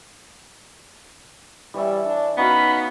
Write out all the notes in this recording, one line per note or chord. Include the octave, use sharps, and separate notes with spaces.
E3 G3 C#5 E5
D4
B3 C#4 D#4 F#4 F5 B5